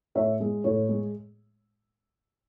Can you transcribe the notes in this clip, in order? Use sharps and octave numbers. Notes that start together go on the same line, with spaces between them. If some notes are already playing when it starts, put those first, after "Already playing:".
A2 C#5 E5
G#3
A2 C#5
G#3